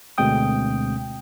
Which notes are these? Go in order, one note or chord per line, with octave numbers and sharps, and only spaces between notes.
D2 B2 G#3 C4 G5 D#6